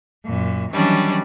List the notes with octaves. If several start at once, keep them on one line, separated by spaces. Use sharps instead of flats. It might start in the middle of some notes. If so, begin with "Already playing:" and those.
F#2 A#2
D#3 E3 F#3 G3 C#4 D4